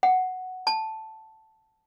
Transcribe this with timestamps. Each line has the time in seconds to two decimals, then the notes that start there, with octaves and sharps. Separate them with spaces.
0.03 F#5
0.67 A5